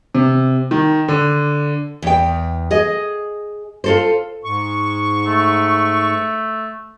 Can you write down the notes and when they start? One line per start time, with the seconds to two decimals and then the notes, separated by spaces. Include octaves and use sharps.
0.15 C3
0.71 D#3
1.08 D3
2.02 E2 G5
2.71 G#4 D#5
3.84 F4 A4 C5
4.44 G#2 C#6
5.26 A3